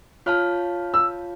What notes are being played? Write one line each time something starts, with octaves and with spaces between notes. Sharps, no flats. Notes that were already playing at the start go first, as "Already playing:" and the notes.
F4 C#5 F5 A5 F6
E6